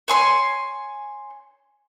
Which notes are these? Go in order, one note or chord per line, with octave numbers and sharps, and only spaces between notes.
C#5 G#5 C6